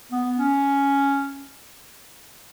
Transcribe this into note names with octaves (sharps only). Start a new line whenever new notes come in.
B3
C#4